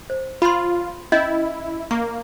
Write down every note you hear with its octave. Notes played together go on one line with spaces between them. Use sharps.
C5
F4 B5 C6
C#4 E4 D#5
A#3 C#6